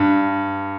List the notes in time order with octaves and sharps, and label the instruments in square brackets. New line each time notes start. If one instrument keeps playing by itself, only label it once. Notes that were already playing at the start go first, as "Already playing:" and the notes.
Already playing: [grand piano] G2